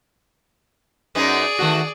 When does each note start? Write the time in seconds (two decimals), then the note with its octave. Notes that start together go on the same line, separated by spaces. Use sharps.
1.15 F#2 B3 D#4 G#4 D5
1.59 D#3 A3 F#4